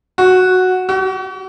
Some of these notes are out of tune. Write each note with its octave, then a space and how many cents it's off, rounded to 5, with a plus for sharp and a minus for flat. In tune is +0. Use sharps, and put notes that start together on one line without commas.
F#4 -5
F#4 +40